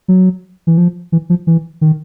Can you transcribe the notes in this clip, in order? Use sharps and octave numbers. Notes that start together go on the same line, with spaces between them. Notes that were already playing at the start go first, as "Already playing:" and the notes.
F#3
E3
F3
E3
F3
E3
D#3